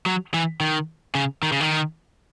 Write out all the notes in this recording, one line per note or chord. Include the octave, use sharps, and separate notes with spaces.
F#3
E3
D#3
C#3
D#3
C#3
D#3